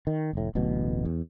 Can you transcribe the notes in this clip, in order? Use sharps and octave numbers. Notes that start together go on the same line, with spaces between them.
D#3
F1 A2
D1 A1 B2
E2